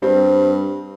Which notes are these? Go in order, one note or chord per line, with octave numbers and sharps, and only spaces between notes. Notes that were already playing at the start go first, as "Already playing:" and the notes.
G2 G3 C4